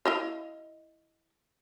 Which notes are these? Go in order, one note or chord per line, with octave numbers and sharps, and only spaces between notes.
E4 D#5 F5